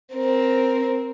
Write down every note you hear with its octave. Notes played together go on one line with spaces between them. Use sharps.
C4 A#4